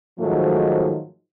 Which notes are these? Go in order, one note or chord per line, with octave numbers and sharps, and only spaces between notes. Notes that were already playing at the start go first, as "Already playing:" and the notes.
G#2 D#3 F3 F#3 A3